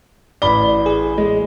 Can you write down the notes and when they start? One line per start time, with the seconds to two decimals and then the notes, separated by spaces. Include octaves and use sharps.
0.42 A1 D5 B5 G7
0.86 G#4
1.18 G#3